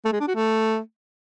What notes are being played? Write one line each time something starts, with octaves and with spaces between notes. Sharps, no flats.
A3
G#3
D4
F#4
A3